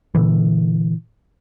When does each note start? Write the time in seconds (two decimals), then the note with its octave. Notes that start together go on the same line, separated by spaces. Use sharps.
0.15 A#2 D3 E3